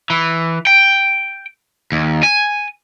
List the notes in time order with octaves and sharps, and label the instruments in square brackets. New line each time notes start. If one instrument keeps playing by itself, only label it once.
[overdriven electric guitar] E3
G5
D#2
G#5